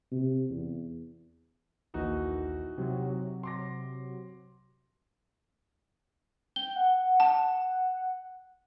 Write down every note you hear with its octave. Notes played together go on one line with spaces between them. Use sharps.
C3
E2
A#1 D#2 E3 D#4 F#4
C3 F#3
C6 D6 A#6
G5 G7
F#5
A5